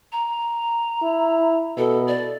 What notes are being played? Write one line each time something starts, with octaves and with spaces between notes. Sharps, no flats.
A#5
E4
B2 A4
D5